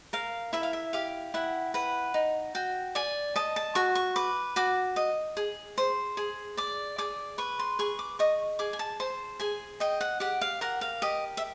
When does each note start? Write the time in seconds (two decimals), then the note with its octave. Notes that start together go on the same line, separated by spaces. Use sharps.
0.13 A#4 F5
0.53 E4 E5
0.63 F5
0.73 E5
0.93 G4 F5
1.34 E4 F#5
1.74 B4 F#5
2.14 D#4
2.55 F#4 G5
2.95 D5 G#5
3.36 D#5 A5
3.56 A5
3.75 F#4 C#6
3.95 C#6
4.16 B4 D6
4.56 F#4 D6
4.96 D#5
5.37 G#4
5.78 C5
6.17 G#4
6.57 D5 D6
6.98 G#4 D6
7.38 B4 C#6
7.59 C6
7.79 G#4 C#6
7.99 D6
8.19 D#5 C#6
8.59 G#4 D6
8.73 G#5
8.79 A5
9.00 C5 A5
9.40 G#4 G#5
9.80 D#5 G5
10.01 F#5
10.20 G4 F#5
10.41 F5
10.61 A#4 F#5
10.81 F5
11.02 G4 D#5
11.37 E5